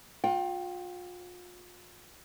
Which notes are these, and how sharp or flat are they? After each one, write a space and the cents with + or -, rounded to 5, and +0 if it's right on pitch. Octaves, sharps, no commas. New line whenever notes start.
F4 +35 G5 -10